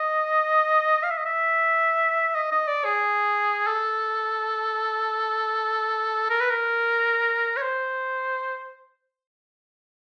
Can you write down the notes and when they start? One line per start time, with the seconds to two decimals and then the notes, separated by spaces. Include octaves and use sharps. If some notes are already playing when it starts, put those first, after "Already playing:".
Already playing: D#5
1.03 F5
1.11 E5
1.18 D#5
1.25 E5
2.35 D#5
2.52 D#5
2.68 D5
2.85 G#4
3.67 A4
6.30 A#4
6.40 B4
6.50 A#4
7.57 C#5
7.62 C5